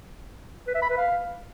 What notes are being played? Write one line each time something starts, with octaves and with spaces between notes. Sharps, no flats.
B4
E5
B5
B4
F5